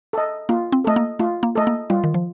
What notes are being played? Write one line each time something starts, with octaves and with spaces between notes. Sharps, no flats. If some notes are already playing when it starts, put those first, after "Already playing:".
A4 D#5
A#3 F4
C4
A3 A4 D#5
A#3
A3 F4
A#3
A3 A4 D#5
A#3
G3 F4
D#3
F3